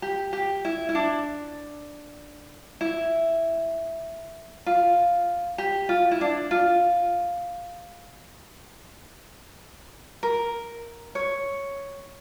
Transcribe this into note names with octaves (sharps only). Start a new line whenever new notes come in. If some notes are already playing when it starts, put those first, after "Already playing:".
G4
G4
E4
E4
D4
E4
F4
G4
F4
E4
D4
F4
A#4
C#5